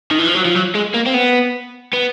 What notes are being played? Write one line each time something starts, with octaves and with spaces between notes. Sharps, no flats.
D#3
E3
F3
F#3
F3
F#3
G#3
A#3
C4
B3
B3